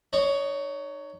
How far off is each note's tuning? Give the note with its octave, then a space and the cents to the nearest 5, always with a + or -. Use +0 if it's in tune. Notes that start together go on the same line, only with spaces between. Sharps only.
D#4 -30 C#5 +15